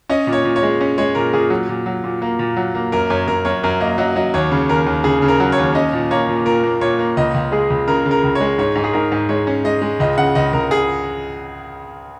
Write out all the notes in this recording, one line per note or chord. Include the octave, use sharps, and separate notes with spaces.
C#4 D#5
A#2
C#5
A#2
C#5
G#3
C#4
G#3 C#5
A#2 A#4
A#2 G#4
F#3
A#2
F#3
A#2
A#3
A#2
F#3
A#3
F#2 A#4
F#2 C#5
F#2 A#4
F#2 C#5
F#2 A#4
A#3 D#5
F#3 D#5
F#3 D#5
D#2 C#5
C#3
D#2 A#4
D#2
C#3 G#4
C#3
A#4
F#3
C#5
D#2
C#4 D#5
A#2
A#3 C#5
A#2
A#2 A#4
A#3
A#2 C#5
A#3
C#2 D#5
C#2
G#3 G#4
C#2
C#3 A#4
C#3
A#4
C#2
G#3 C#5
G#2 C#5
G#2
G#4
G#2 A#4
G#2
G#3 C#5
C#4
G#3 D#5
G#3
C#2 D#5
C#3 F#5
C#2 D#5
C#2 A#4
G#4